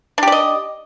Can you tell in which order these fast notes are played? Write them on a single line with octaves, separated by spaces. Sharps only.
D4 G4 D5 D#5